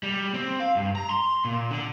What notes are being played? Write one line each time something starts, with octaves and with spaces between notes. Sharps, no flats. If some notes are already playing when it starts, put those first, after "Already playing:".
G3
C4
F5
G2
A#5
C6
A#2
D3